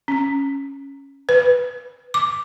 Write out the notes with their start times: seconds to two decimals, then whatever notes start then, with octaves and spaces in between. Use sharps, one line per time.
0.08 C#4
1.29 B4
2.14 D6